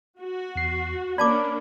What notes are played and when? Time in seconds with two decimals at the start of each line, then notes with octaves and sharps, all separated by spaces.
0.21 F#4
0.56 E2 C7
1.18 A#3 C#4 D4 D5 A5 B5 D6